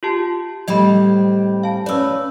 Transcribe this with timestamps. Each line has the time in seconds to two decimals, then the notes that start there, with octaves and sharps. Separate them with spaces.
0.03 F4 G4 A5
0.68 A2 G3 C4 D#5 B5
1.63 F5 A5
1.86 C#4 B4 D5 E6